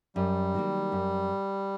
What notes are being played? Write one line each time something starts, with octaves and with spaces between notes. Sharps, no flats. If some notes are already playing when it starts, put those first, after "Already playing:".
F#2 G3
D#3 F#3 A#3
F#2